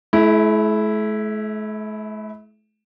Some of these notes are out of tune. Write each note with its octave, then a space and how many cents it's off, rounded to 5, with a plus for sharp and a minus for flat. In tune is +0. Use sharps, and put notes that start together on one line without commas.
A3 -45 E4 +0